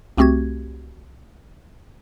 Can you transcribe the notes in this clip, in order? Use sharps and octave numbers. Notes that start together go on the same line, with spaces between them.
C2 A3 C4 F#4 G4 G#6